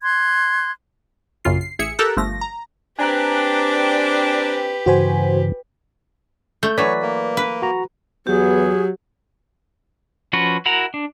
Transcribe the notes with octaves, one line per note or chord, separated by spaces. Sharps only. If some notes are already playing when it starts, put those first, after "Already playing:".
C6 F#6 G#6
A#1 F#2 C#3 F4 C7
C7
A1 G#4 E5 C#7
G4 A4 A#4 A#5 E6 F#6
G1 F3 A3 A#6
A#5
C4 D4 G4 B4 G#5 A#5 F#6
G2 C#3 E3 F#4 C5 G#5
A3 G6
E3 F#3 B4 C#5 D5 B6
A#3
B4
F#4 A#5
E2 F#3 B3 G4 G#4
F3 C#4 F#4 B4
E4 F#4 A#4 F#5 A#5
D4